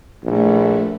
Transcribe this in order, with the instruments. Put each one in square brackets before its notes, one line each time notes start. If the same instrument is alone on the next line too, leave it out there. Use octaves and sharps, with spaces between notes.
[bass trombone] A#1 [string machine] A#2 A3 E4